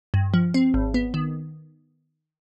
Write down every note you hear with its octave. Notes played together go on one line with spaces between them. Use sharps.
G2
F3
C4
G#1
B3
D#3